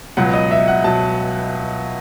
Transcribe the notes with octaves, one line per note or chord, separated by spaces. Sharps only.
C#2 B2 F#3 F#5
D#5
E5
F#5
B2 F#3 A5